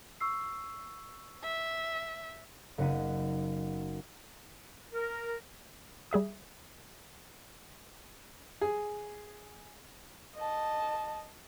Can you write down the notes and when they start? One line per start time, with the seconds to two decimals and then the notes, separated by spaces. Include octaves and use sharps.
0.20 C#6 E6 C7
1.44 E5
2.78 F#1 B3 D#4 F#5 B6 D#7
4.93 A#4
6.11 G3 G#4 E5 D#6
8.61 G#4
10.36 D#5 A5